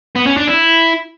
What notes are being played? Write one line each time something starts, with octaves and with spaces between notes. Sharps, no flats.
B3
C#4
D4
E4